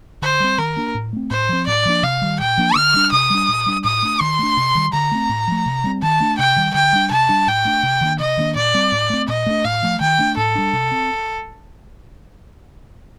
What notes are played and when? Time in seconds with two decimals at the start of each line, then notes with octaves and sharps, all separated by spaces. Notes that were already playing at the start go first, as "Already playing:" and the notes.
0.22 D3 C5
0.40 G3 C4
0.58 D#3 A#4
0.77 A#3 D4
0.95 A2
1.13 A3 C4
1.30 A2 C5
1.49 F3 C4
1.67 A2 D5
1.85 F3 A#3 D4
2.03 C3 F5
2.22 D#3 G3
2.39 A#2 G5
2.58 F3 A#3 D4
2.76 D3 F6
2.94 G3 D4
3.12 C3 D#6
3.30 G3 D4
3.48 A#2
3.66 G3 D4
3.84 A2 D#6
4.02 A3 D4
4.20 D#3 C6
4.39 A3 D4
4.57 C3
4.75 D#3 G3
4.93 D3 A#5
5.12 A3 C4
5.29 A2
5.48 F3 A3
5.66 C3
5.84 G3 C4
6.02 D#3 A5
6.20 A3 D4
6.39 C3 G5
6.56 D#3 G3
6.74 D3 G5
6.93 G3 D4
7.11 C3 A5
7.29 G3 D4
7.47 A2 G5
7.65 A3 D4
7.83 C3
8.01 D#3 A#3 D4
8.19 C3 D#5
8.38 D#3 A#3 D4
8.56 A#2 D5
8.74 G3 C4
8.92 A2
9.10 A3 C4
9.28 A#2 D#5
9.46 A3 D4
9.65 A2 F5
9.83 F3 A3
10.01 D#3 G5
10.19 A3 D4
10.37 A2 A4
10.55 G3 D4
10.73 C3
10.91 C4